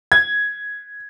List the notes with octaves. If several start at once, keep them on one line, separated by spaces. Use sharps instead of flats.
G#6